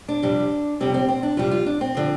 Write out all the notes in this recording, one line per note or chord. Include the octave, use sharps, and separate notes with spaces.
D4
F2 C3 G3
F2 C3 G3 C4
C4
C4
D4
F2 C3 G3 F4
F4
D4
C4
D3 F3